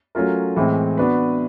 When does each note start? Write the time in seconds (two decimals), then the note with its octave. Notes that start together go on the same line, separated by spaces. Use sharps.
0.15 F#3 A3 C#4 F4 A#4
0.57 A2 E3 G#3 C4
0.98 B3 D4 F#4 B4